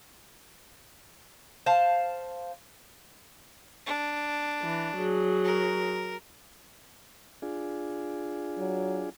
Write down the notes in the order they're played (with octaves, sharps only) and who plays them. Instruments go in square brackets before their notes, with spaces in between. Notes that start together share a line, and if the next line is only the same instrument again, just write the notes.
[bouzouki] C5 F5 A5
[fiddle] D4
[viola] E3
F#3 G#4
[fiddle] A#4
[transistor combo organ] D4 F4 G#4
[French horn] F#3